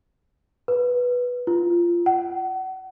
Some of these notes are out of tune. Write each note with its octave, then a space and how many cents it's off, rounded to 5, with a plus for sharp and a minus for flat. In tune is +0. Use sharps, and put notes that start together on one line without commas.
B4 -5
F4 -15
F#5 +35